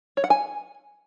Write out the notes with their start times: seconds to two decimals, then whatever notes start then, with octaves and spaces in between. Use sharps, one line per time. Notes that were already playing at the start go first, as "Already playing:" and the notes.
0.17 C#5
0.24 F#5
0.30 G#5